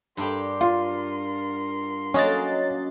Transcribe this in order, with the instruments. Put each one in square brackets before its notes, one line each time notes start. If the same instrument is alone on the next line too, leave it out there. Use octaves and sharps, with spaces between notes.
[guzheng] G2 D4 G4 [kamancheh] A#4 C6
[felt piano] F4
[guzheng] F#3 A#3 [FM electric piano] C#4 D#5 A6